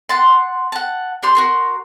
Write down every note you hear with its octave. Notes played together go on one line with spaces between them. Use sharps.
F#5 A5 C6
F#5 A5
D4 G4 C6
F#4 A#4 C6